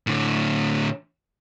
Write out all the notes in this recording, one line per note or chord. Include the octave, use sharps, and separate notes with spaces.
A2 D3